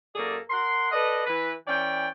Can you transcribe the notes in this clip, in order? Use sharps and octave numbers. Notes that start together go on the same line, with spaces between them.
F#2 A#3 G#4 A4 D5
A#4 F#5 C6
A4 B4 D5 D#5
E3 B4
E3 C#4 D5 G5